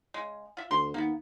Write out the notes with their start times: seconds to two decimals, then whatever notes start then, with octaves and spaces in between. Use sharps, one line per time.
0.14 C#3 G#3
0.57 F4 E5
0.71 D2 C6
0.94 D#2 A#3 B3